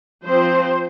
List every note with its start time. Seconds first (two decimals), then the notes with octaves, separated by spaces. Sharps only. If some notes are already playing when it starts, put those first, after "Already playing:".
0.25 F3 C4 C5